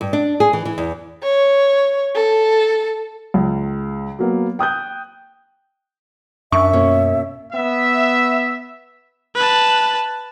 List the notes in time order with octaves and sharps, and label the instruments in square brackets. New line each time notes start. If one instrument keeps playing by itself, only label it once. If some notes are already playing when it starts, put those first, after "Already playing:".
[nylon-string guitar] G2
D4
G#4
E3
E3
E2
[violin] C#5
A4
[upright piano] C#2
F#3 A#3 B3
G5 D#6 F#6 G6
[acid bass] F#2 [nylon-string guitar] D4 [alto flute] E5 [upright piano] C#6
[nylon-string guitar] B2 A#3 C#4
[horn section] B3 E5
[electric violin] B4 A5